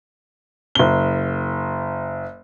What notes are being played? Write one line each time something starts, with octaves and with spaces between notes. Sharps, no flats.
F#1 G7